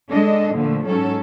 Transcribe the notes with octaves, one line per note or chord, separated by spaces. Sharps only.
G#3 D4 A4 D#5
A#2 D3 F3 A3
G#2 F#3 C#4 A4